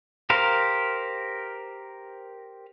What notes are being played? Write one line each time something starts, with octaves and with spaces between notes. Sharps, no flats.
G4 A#4 C5 F5